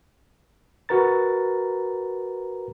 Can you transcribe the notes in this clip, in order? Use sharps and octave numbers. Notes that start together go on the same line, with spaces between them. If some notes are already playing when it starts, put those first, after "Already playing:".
F#4 A#4 B4 A#5 A6